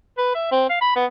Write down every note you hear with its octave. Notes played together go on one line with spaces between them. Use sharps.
B4
E5
C4
F5
B5
B3